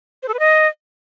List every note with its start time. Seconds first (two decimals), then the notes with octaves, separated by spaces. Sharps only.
0.23 C5
0.28 A4
0.34 B4
0.39 D#5